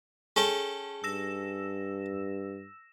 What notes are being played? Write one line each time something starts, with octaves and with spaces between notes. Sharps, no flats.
C#4 G#4 A4 G5
G2 E6 A#6 E7